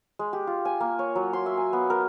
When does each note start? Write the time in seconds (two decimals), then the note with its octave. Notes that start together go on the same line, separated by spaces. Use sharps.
0.19 G#3
0.33 G4
0.47 F4
0.65 G#5
0.81 A#3
0.99 C#5
1.15 F#3
1.33 C6
1.46 E5
1.57 G#5
1.73 B3
1.90 A#4